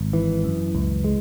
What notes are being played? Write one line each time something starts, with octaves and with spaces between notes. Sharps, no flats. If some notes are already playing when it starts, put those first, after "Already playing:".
Already playing: G#1
E3
F#2
C#2
G#3